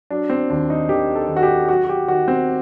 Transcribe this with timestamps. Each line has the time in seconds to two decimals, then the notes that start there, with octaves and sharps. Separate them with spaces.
0.10 F#3 D4
0.30 C4
0.50 D#2 D4
0.70 D#4
0.89 D#3 G4
1.16 A4
1.29 D#3
1.37 F#4
1.43 G4
1.68 F#3 F#4
1.84 F#4
1.89 G4
2.08 D#3 F#4
2.28 C4